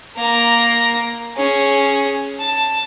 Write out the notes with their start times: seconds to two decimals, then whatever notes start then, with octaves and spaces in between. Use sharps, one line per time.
0.17 A#3 A#5
1.37 C#4 G#4
2.39 A5